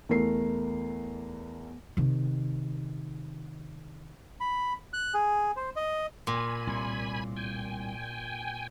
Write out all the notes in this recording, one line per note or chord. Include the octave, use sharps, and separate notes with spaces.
E2 A3 A#4 C7
C3 D#3
B5
F#6
G#4
C5
D#5
A#2 G#5 B5
C2 A2
G5 G#5